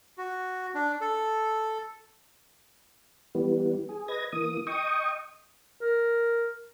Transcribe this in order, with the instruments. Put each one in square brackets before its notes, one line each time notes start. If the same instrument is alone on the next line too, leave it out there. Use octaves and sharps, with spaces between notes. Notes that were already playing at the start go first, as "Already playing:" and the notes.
[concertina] F#4
D4
A4
[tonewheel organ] E3 G3 B3
G#4
B4 D#5 G#6 A#6
E3 A#3 D#6
D#5 G5 C#6 D#6
[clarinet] A#4